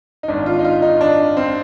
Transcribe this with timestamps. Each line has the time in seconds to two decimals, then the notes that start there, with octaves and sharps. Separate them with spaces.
0.23 D#4
0.28 G#1 G#2 D#3 D4
0.46 F4
0.59 D#4
0.65 F4
0.82 D#4
1.01 D4
1.37 C4